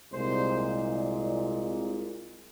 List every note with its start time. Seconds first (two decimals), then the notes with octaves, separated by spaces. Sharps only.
0.13 C2 A#2 G#3 C5